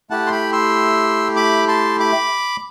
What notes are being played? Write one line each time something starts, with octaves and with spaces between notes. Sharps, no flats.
A3 E4 G4 F#5 A5
C6
G5 B5
C6 E6
B5 D6
A5 C6
B5 D6